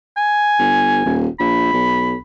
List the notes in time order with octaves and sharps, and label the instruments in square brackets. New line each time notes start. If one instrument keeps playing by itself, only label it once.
[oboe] G#5
[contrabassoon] G1
D#1
[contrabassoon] A#1 [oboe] B5
[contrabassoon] B1